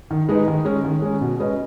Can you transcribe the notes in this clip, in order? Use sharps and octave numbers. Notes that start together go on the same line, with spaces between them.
D#3
G#3 D#4 B4 D#5
D#3
G#3 C#4
D#3
G#3 C#4
B2
G#3 C#4 B4 D#5